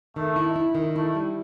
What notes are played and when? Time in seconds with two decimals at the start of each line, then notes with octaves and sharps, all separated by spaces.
0.16 D#3 A3
0.36 E4
0.56 E4
0.75 D#3
0.95 A3 E4
1.15 G3